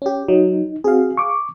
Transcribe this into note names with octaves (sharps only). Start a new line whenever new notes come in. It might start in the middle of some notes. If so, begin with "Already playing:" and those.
C#4 G4
F#3 D#4
C4 F#4 G#4 F5
C#6 D6